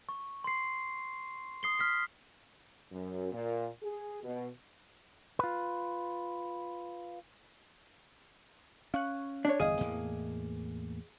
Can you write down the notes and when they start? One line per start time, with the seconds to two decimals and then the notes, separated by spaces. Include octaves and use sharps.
0.09 C#6
0.44 C6 C7
1.63 D#6 C7 G7
1.79 F6 B6 C7
2.91 F#2
3.32 A#2
3.83 G#4
4.24 B2
5.39 F4 B4
8.94 C#4 F5 C#6 F#6
9.45 D4 C#5
9.60 G1 E2 G#4 D#5 F5 D#6
9.81 E2 A2 A#3